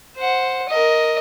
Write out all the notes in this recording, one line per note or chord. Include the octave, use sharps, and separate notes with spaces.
C5 F#5
A#4 D#5